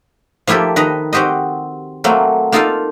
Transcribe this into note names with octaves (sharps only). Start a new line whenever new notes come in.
F3 A#3 E4 G4 A4
D#3 B4 D#5 A#5
C4 F#4 G4 C5 D#5
F#3 A3 A#3 C4
A#3 D#4 F4 A4 A#4 F5